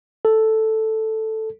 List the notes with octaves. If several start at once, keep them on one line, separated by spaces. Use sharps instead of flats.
A4